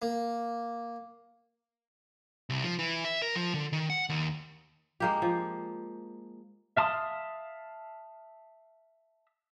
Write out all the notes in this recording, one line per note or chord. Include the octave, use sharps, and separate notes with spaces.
A#3
C2
F3
E3
E5
A#4
F3
D3
D#3
F#5
D#2
G#3 A#3 G4
F3
E5 F5 A5 C6 D#6